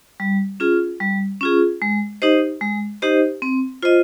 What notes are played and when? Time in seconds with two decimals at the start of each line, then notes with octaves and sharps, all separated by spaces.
0.20 G3
0.60 C#4 F4 G#4
1.01 G3
1.41 C#4 F4 G#4
1.82 G#3
2.22 D#4 G4 C5 D#5
2.61 G#3
3.02 D#4 G4 C5 D#5
3.42 C4
3.82 F4 C5 D#5